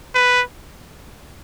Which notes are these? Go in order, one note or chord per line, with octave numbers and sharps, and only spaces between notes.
B4